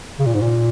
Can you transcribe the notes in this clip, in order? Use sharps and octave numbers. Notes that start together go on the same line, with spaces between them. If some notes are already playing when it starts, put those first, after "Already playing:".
C#3
A#2
G#2
A#2